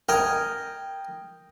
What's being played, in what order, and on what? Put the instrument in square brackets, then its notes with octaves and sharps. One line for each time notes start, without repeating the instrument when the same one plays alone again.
[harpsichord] A#4 D#5 G#5 [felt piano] G5